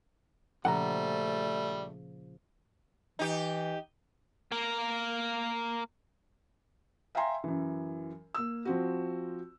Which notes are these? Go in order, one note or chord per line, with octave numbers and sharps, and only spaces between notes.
A#2 C#3 F3 G3 A3 F#5 G5 A#5
E3 D#4 G4
A#3 A#4
E5 F5 G5 G#5 A#5 C6
F#2 E3
A#3 E6
F3 C4 F#4